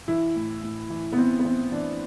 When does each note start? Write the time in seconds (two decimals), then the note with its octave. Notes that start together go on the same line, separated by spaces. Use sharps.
0.08 E3 E4
0.36 A2
0.63 A2
0.90 E3
1.12 B3
1.17 E3 C4
1.39 B3
1.45 E3 C4
1.72 E3 D4